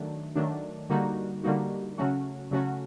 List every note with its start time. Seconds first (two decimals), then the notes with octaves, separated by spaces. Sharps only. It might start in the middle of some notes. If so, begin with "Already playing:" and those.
Already playing: D#3 F#3 A3 D4
0.36 D#3 F#3 A3 D4
0.90 D3 G3 A#3 D#4 F#4
1.43 D3 G3 A#3 D#4 F#4
1.98 C#3 F#3 A3 C#4 F#4
2.51 C#3 F#3 A3 C#4 F#4